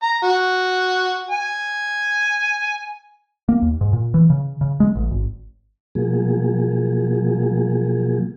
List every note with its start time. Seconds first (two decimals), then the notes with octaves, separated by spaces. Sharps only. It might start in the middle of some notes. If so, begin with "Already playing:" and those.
0.02 A#5
0.23 F#4
1.31 G#5
3.49 A#3
3.62 D#2
3.81 G#2
3.93 A#2
4.14 E3
4.30 C#3
4.61 C#3
4.80 G#3
4.96 A1
5.11 G#1
5.95 B2 F3 F#3 A#3 G#4